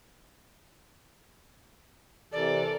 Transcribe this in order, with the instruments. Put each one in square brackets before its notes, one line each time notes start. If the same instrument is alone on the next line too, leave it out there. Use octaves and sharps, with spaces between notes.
[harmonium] C3 E3 [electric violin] A4 A#4 [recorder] D5